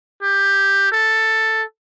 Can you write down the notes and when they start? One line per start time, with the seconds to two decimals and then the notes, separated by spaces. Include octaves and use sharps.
0.23 G4
0.92 A4